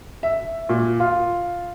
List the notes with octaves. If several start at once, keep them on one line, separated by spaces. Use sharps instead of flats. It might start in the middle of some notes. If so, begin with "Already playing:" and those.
E5
A#2
F4